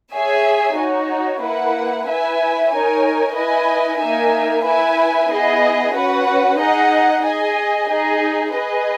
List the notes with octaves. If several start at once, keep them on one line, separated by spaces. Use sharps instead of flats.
G#4 C#5 E5 G#5
D#4 F#4 C#5
A#3 E4 B4 F#5
E4 B4 E5 G#5
D#4 A#4 C#5 G#5
E4 B4 D#5 G#5
A#3 D#4 A#4 E5 G#5
E4 B4 E5 G#5
B3 E4 G#4 D#5
C#4 F#4 B4 F#5
D#4 G#4 D#5 F#5
G#4 D#5 G#5
D#4 G#4 D#5
G#4 B4 D#5